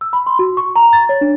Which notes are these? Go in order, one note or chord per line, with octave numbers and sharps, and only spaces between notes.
E6
B5
C6
F#4
C#6
A#5
A6
C#5
D4